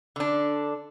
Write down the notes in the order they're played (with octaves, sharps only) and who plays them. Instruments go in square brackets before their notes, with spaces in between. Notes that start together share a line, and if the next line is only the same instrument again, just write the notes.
[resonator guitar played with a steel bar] D3 D4